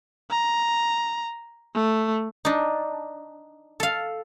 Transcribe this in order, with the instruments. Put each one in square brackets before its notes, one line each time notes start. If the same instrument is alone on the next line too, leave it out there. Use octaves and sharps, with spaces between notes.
[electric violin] A#5
A3
[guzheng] D4 D#4
A4 F5